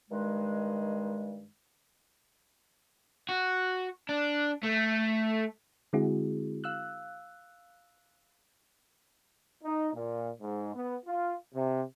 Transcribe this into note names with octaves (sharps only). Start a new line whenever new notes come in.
G2 D#3 G#3
F#4
D4
A3
D3 G#3 C4 E4 F#4 G#4
F5 E6 F#6
D#4
A#2
G#2
B3
F4
C3